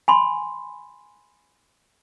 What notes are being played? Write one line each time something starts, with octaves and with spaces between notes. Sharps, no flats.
G#5 B5 C6